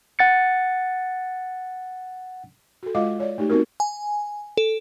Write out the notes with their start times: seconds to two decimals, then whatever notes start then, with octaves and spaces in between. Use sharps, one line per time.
0.19 F#5 A6 C#7
2.83 F#4 A4
2.95 G#3 F4 D#5 F5 D6
3.20 C#5 D5
3.38 A3 D#4 G4
3.50 B3 C4 D#4 F#4 A#4
3.80 G#5
4.57 A4